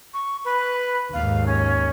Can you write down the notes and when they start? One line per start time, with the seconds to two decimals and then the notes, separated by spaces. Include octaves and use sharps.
0.14 C#6
0.45 B4
1.13 D#2 G#2 F5
1.46 C#4